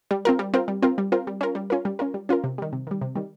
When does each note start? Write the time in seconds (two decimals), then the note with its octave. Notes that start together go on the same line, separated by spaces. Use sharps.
0.11 G3
0.25 C4 F4 A#4
0.39 G3
0.54 C4 F4 A#4
0.68 G3
0.82 C4 F4 A#4
0.98 G3
1.12 C4 F4 A#4
1.27 G3
1.41 C#4 F4 A#4
1.55 G3
1.70 C#4 F4 A#4
1.85 G3
1.99 C#4 F4 A#4
2.14 G3
2.29 C#4 F4 A#4
2.44 C3
2.58 D#3 G3
2.73 C3
2.87 D#3 G3
3.01 C3
3.15 D#3 G3